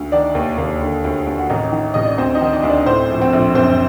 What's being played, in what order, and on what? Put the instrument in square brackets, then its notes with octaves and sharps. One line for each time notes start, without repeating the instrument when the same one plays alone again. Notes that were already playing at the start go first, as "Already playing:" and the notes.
Already playing: [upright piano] D2
D#3 D4 D5
D#2
D#2
D3
D2
D2
F#4
A1 D#3 D#4
D#3
A1 D#5
D5
D2 C4 C5
D#4 D#5
D#3
D4 D5
D2
D4 D5
A2 C4 C5
A#1
C4 C5
A#1
F#1 C4 C5